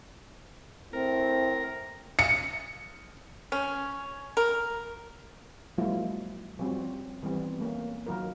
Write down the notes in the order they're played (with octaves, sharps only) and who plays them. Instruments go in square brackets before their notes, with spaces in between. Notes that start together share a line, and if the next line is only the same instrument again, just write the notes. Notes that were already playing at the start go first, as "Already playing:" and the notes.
[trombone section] A2 C4 [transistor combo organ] A#4
[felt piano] C#7
[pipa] C#4
A#4
[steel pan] F3 F#3 G#3 A#3 E4 F4
F3 G3 C4 C#4 F#4
D#3 E3 G3 B3 C4
A3 A#3 C#4
D#3 F#3 F4 A#4